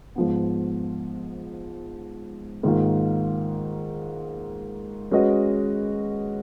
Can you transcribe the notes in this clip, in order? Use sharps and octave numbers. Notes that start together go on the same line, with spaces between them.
G#2 F3 B3
G#2 D#3 A#3 F4
G#3 C#4 F#4 B4 D#5